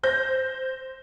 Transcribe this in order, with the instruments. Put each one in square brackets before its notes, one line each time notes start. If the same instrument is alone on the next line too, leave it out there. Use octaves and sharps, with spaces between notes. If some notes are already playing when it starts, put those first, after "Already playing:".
[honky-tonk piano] C5 G6 A#6